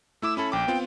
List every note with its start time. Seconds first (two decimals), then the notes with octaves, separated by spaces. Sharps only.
0.22 A3 E4 D6 E6
0.37 C#4 E4 A4 B5
0.52 A#1 G5 D6
0.68 B3 C4 F4